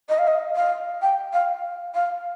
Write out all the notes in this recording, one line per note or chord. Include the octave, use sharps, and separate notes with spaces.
D#5
F5
D#5
F5
G5
F5
F5